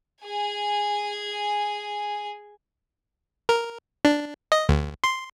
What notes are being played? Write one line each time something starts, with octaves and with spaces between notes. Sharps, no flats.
G#4 G#5
A#4
D4
D#5
D2
C6